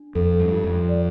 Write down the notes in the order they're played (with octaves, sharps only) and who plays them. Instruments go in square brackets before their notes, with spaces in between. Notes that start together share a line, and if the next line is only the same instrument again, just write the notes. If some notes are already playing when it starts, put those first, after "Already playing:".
Already playing: [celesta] D4
[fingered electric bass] F2 [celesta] A4
[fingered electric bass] G2
[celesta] F4
[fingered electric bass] F2
[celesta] D5